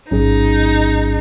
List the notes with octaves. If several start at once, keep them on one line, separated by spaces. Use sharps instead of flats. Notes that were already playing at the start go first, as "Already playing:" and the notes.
A1 G#2 F#3 C#4 D#4 G#4